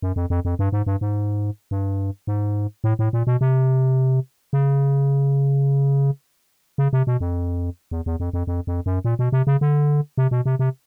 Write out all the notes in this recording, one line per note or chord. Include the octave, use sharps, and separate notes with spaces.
F#2
F2
F2
F2
G2
G#2
G2
G#2
G2
G#2
A2
A2
A#2
B2
C3
C#3
C#3
C3
B2
F2
E2
E2
F2
F2
F2
F2
F#2
A#2
B2
C3
C#3
D3
C3
B2
C3
C3